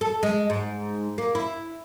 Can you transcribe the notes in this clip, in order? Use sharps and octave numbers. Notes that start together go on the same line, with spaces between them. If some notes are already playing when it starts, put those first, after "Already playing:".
A4
G#3
G#2
A#3
E4